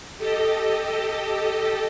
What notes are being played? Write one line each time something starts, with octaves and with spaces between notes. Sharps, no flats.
G4 A4 D#5